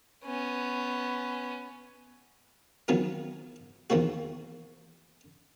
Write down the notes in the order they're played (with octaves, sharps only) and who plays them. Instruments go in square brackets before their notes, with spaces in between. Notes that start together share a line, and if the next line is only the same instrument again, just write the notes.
[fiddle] B3 C#4
[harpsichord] D#3 F3 F#3 B3 C#4 D#4
E2 D#3 F3 A#3 F#4